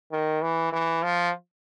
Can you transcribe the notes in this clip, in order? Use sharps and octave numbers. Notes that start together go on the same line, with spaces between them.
D#3
E3
E3
F3